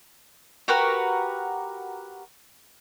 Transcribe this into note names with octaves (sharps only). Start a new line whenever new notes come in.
F#4 G4 A#4 B4